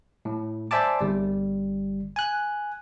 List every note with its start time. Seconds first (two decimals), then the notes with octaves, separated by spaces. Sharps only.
0.25 A2
0.71 C5 D5 E5 G#5 A5 D6
1.01 G1 G3
2.16 G#5 F#6